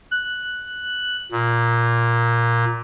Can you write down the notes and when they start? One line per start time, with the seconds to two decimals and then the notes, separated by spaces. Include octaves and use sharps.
0.11 F#6
1.32 A#2